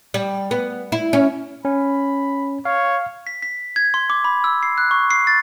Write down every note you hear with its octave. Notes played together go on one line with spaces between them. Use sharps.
G3
B3
E4
C#4
C#4 B5
C#5 F5
B6
B6
G#6
C6
D6
B5
E6
C7
F#6
C#6
C7
A6